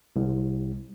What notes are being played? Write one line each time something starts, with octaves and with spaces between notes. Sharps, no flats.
C2